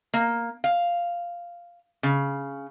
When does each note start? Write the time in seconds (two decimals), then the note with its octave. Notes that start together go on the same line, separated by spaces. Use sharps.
0.14 A#3
0.64 F5
2.03 C#3